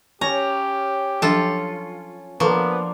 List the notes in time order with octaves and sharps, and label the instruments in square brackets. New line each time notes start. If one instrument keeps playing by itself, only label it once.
[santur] C#4 C#5 [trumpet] G4 [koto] A#5
[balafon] F3 F#3 D4 [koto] F4 A4
[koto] F3 [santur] A#3 D4 [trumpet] B3 [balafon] A4 B4 C#6